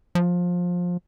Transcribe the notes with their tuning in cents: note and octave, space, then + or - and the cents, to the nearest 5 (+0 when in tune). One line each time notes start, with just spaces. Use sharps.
F3 +20